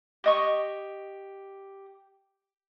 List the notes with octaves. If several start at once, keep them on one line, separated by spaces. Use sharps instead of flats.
G4 D#5 C#6